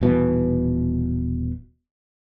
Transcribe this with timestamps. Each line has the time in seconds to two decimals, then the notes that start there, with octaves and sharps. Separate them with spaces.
0.01 D#1 B2 E3